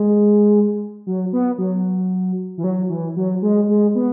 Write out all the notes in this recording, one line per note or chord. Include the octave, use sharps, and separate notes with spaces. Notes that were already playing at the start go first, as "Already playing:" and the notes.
Already playing: G#3
F#3
B3
F#3
E3
F#3
E3
F#3
G#3
G#3
B3